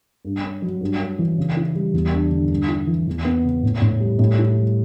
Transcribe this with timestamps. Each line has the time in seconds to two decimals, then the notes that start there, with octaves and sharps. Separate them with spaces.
0.25 G2
0.43 C#4
0.62 F#3
0.81 G2
1.00 C#4
1.19 E3
1.38 C#3
1.57 E4
1.75 G3
1.94 E2
2.13 D4
2.31 D3
2.50 G2
2.69 E4
2.87 E3
3.07 E2
3.25 B3
3.45 C#3
3.63 A2
3.82 A2
4.00 G3
4.19 A2
4.39 E4
4.57 G3